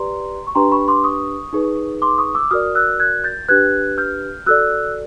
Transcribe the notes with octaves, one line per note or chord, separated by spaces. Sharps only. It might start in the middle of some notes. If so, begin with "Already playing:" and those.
Already playing: G4 B4 D5 A#5 C6
C#6
D4 G4 B4 A#5 C6
B5 C#6
C6 D6
C#6 D#6
D#4 G#4 B4
C6 D6
C#6 D#6
D6 E6
F#4 A#4 D5 D#6 F6
E6 F#6
F#6 G#6
G6 A6
D4 G4 B4 F#6 G#6
F6 G6
F#4 A4 D5 E6 F#6